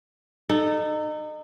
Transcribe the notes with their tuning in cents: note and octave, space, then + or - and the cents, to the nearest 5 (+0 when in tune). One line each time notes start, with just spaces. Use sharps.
D#4 -30 A4 +0